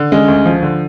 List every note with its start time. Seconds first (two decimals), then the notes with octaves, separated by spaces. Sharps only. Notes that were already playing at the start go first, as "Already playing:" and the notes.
Already playing: D3
0.11 G#3 C#4
0.28 D2
0.45 F3
0.62 D3